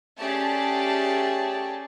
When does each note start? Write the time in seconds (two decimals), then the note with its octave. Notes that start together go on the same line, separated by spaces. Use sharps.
0.18 A3 C#4 G4 G#4 D5 A5